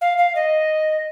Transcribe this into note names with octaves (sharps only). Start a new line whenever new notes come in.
F5
F5
D#5